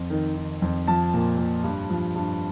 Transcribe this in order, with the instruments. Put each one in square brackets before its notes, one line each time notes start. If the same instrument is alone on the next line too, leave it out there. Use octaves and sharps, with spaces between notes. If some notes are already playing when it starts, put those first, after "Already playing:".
Already playing: [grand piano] F2
D#3
D#3
F2
F3 A5
A#2
A#2
G2
F3
G2